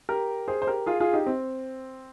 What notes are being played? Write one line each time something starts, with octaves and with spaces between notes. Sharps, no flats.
G4 A#4
G#4 C5
C5
G4 A#4
F4 G#4
F4 G#4
D#4 G4
C4